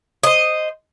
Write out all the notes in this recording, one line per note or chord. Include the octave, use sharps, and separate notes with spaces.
C5 D#5